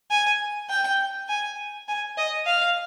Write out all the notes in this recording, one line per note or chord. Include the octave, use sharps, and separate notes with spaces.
G#5
G5
G#5
G#5
D#5
F5